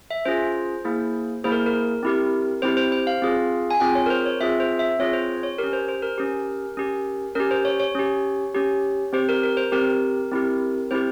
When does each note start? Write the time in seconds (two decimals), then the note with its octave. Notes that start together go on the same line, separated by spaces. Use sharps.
0.11 E5
0.25 C#4 F4 G#4 C5
0.85 A#3 E4 G#4
1.44 A#3 E4 G#4 C5
1.52 A#4
1.66 A#4
2.03 C4 E4 G4
2.62 C4 E4 G4 C5
2.77 C5
2.92 C5
3.07 F5
3.22 C4 F4 G#4
3.71 G#5
3.80 C4 F4 G#4 G5
3.95 C#5
4.06 A#4
4.10 C5
4.26 C#5
4.40 C4 F4 G#4 E5
4.60 C5
4.79 E5
4.99 C4 F4 G#4 C#5
5.13 C5
5.43 C#5
5.59 C#4 G4 A#4
5.73 C5
5.89 C5
6.02 A#4
6.18 C#4 G4
6.77 C#4 G4
7.35 C#4 G4 A#4
7.51 C5
7.65 C#5
7.80 C#5
7.95 C#4 G4
8.54 C#4 G4
9.13 C4 G4 C5
9.29 A#4
9.43 A#4
9.57 C5
9.72 C4 G4 A#4
10.32 C4 E4 G4
10.91 C4 E4 G4 C5